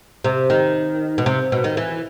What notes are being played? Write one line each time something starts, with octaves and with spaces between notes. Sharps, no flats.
C3
D#3
B2
C3
B2
D#3
E3